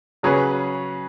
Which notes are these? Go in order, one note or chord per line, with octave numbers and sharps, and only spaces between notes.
C#3 F#3 C#4 G#4 B4